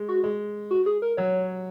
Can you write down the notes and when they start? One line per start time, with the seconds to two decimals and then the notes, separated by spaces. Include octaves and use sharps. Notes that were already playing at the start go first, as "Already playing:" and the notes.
Already playing: G#3
0.08 F#4
0.24 G#3
0.71 F#4
0.86 G#4
1.02 A#4
1.17 F#3 C#5